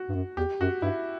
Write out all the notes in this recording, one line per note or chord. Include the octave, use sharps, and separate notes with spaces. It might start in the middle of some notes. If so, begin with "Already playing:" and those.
Already playing: F#4
G2
F#2
E2 G4
F#2 F#4
G2 E4